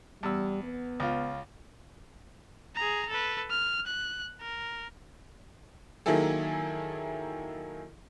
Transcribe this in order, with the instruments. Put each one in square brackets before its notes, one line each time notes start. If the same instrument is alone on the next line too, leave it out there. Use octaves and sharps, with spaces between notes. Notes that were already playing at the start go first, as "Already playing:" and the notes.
[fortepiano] E2 E6 [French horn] G3
[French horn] B3
[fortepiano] C#2 F4
[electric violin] G#4 A#5
A4 B4
F6
F#6
A#4
[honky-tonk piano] D#3 F#3 A#3 E4 G#4 A4